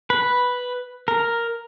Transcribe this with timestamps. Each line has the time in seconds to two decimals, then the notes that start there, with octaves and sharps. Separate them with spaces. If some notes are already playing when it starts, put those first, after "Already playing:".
0.10 B4
1.08 A#4